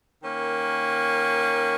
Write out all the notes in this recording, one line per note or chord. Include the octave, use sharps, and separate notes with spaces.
D#3 A#3 C#4